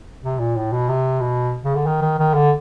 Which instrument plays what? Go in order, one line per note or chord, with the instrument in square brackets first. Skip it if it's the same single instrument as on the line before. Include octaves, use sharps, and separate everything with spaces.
[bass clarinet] C3
A#2
A2
B2
C3
B2
C#3
D3
D#3
D#3
D#3
D3